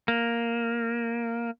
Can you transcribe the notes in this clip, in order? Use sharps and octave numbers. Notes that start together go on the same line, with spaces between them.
A#3